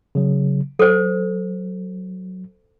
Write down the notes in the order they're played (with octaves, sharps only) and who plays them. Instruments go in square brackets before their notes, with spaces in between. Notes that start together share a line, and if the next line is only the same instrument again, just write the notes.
[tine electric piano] C#3 F#3
[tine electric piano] F#3 [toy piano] A4 C5